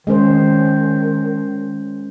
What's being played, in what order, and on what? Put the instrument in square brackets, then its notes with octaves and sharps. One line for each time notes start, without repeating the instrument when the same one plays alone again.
[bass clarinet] D#3 [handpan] G#3 C#4 C5